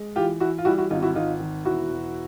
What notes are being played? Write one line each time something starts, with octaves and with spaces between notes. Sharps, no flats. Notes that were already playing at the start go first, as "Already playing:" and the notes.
Already playing: G#3
E3 F4 G4
E3 E4 F#4
F4
G3 E4 F#4
E4 F#4
G#1 D#4 F4
E4 F#4
G#1 D#4 F4
D#3
E1 E4 F#4
E1